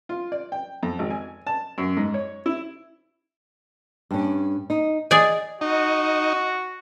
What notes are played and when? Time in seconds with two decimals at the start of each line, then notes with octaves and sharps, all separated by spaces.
0.09 F4
0.32 D5
0.52 G5
0.83 F2
0.99 G#1
1.10 G#5
1.47 A5
1.78 F#2
1.97 G#2
2.14 C#5
2.46 E4
4.11 G2 C#4
4.70 D#4
5.11 G#4 D5 D#5 G#5
5.61 D#4 F#4